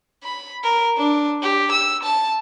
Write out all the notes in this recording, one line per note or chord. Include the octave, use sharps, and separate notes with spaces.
B5
A#4
D4
G4
E6
A5